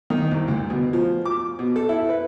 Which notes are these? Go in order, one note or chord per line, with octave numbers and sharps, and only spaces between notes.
D#3
C2
D2
B2
F3
D6
B2
A4
E4
B4